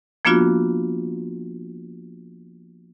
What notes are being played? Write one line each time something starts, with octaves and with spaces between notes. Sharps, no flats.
F3 A#3 B3 D4 F4 F#4